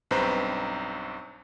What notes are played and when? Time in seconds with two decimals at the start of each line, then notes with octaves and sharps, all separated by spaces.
0.11 B1 G2 C4 B4 C5 A#5